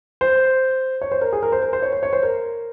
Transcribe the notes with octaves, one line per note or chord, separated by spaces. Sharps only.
C5
C#5
C5
A#4
G#4
A#4
C5
A#4
C5
C#5
C5
C#5
C5
A#4